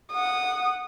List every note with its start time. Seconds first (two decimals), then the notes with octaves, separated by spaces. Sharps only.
0.13 F#5 D#6